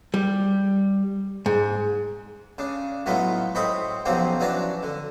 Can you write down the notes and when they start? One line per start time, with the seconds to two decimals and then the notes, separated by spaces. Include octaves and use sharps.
0.14 G3
1.46 G#2
2.58 C#3 D4
3.06 A2 F#3 G#3 A3 B3 F4
3.55 A2 G#3 C4 B5 C#6 D#6
4.06 B1 C#3 F3 F#3 C4 G4
4.40 E3 F#3 C#4 D4 A5 A#5
4.83 D3